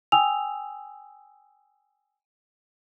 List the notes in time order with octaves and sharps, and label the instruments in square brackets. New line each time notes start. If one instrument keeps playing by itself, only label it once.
[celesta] G5 G#5 D#6 E6 F7